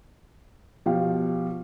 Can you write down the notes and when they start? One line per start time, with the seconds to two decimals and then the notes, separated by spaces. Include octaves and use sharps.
0.86 B2 F3 G4 F5